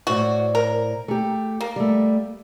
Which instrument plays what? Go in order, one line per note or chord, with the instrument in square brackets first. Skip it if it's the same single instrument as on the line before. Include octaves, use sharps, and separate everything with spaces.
[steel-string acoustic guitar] A2 C5 D5 [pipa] F#4
[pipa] A#4
[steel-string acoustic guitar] A3 G4
[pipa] A#3
[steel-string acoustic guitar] G3 A3